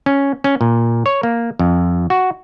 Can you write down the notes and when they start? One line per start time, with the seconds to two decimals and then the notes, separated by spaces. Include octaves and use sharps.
0.06 C#4
0.44 C#4
0.61 A#2
1.06 C#5
1.23 A#3
1.59 F2
2.10 F#4